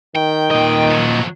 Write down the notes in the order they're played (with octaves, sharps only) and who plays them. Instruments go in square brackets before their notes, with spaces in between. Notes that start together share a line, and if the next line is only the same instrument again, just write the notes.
[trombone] D#3 [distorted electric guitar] G5
[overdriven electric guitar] A#2 D#5
[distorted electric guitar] F2 F#3